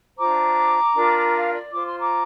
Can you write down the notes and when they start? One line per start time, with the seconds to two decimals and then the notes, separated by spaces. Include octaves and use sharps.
0.18 D4 F4 C5 A#5 D6
0.95 D4 F4 A#4
1.34 F5
1.53 D5
1.72 F4 C5 D6
1.86 C6
1.99 A#5 D6